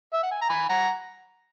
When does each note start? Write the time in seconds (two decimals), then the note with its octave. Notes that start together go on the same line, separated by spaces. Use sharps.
0.13 E5
0.23 F#5
0.31 G#5
0.41 A#5
0.49 G#5 B5
0.69 F#5 A#5